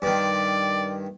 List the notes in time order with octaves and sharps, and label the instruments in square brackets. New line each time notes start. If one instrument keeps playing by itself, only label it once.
[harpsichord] G2 D#3 [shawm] D5